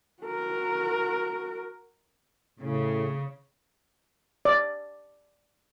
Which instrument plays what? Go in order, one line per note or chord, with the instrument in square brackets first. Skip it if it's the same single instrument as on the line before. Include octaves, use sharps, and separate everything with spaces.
[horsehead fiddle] F#4 A#4
[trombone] A2 [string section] C#3
[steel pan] D5